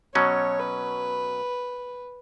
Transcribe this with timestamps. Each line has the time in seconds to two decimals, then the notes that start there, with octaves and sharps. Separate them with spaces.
0.15 B2 F#3 C#4 C#5
0.60 B4